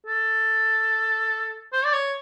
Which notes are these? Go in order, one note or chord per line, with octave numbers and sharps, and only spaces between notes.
A4
C5
D5
C#5